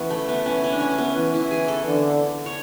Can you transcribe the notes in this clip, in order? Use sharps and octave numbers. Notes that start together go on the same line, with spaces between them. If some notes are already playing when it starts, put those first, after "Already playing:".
Already playing: E3 B3 C#4
A3
B3
E3 C#4
C#4
D4
C#4
B3
E3
E4
G#4
A4
D3
C#5